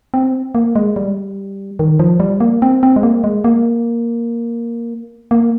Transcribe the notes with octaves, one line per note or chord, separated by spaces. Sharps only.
C4
A#3
G#3
G3
D#3
F3
G3
A#3
C4
C4
G#3
A#3
G#3
A#3
A#3